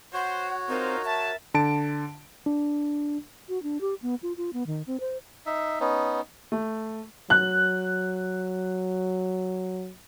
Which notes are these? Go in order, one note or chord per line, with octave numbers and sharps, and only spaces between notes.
F#4 C5 C#5 F#5
C4 D#4 F4 A#4 C5
E5 A5
D3 A5 D7
D4
F#4
D4
G4
B3
F4
F4
B3
D#3
C4
C5
D#4 E5
B3 C#4 D#4
A3
F#3 F#6